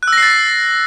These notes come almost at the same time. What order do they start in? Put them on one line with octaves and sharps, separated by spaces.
F#6 E6 A#6 C7 A6